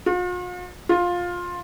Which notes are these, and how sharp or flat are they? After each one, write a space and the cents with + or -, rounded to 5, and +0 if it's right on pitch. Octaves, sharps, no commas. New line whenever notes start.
F4 +45
F4 +15